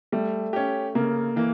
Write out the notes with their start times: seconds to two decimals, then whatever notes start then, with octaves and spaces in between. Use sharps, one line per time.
0.12 G3 A3
0.53 C#4 G4
0.95 C#3 A#3
1.36 E3 A#3